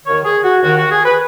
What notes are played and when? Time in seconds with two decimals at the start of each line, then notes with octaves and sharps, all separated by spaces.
0.06 D#2 D#3 C#5
0.25 G#4
0.44 F#4
0.63 D#2 D#3 F#4
0.77 F#4
0.91 G#4
1.05 B4